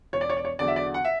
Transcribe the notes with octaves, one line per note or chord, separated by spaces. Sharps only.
E1 C#5
D5
C#5
D5
C#5
E2 D3 F#3 D5
E5
D5
F#5
E5